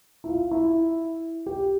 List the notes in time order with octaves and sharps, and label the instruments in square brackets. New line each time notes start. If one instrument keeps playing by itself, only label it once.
[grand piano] E4
F4
E4
G4